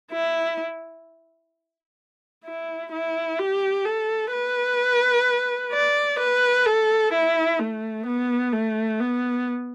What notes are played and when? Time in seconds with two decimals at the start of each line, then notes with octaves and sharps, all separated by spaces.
0.12 E4
2.45 E4
2.92 E4
3.39 G4
3.86 A4
4.32 B4
5.72 D5
6.19 B4
6.66 A4
7.13 E4
7.59 A3
8.06 B3
8.53 A3
9.00 B3